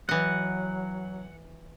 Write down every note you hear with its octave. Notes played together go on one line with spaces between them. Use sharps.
E3 F#3 D#5 F#5